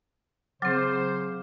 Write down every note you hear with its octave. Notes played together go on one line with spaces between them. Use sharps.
C#3 F#3 C4 C5 F#5 D6 F6